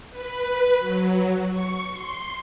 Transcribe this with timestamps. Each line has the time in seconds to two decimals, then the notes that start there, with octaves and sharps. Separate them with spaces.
0.10 B4
0.79 F#3
1.50 C#6
1.91 C6